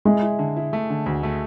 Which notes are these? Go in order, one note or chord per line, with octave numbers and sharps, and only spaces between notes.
G#3 E4
E4
D3
E4
A3
D3
D2
A3